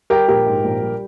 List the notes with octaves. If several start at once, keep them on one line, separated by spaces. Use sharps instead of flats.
G3 G4 A#4
A#1 G4 A#4
G#2
A#1
G3